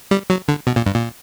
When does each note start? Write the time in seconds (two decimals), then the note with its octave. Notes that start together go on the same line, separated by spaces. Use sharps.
0.11 G3
0.30 F#3
0.48 D3
0.67 B2
0.76 A#2
0.86 G2
0.95 A#2